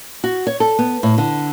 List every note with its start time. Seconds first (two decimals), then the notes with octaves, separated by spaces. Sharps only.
0.24 F#4
0.47 C#5
0.60 A4
0.79 B3
1.03 A2
1.18 D3